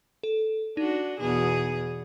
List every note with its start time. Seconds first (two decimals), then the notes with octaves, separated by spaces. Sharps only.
0.23 A4
0.77 D4 D#4 F#4
1.20 E2 B2 G#4